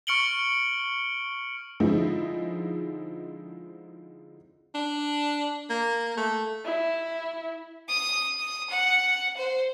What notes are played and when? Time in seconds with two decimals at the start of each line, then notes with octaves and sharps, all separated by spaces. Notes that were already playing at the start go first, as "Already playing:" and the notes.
0.07 C#6 F6 C#7 D7 F#7 G7
1.80 D3 F3 G#3 C4 D#4 E4
4.75 D4
5.70 A#3
6.17 A3
6.65 E4
7.88 D#6
8.39 D#6
8.70 F#5
9.37 C5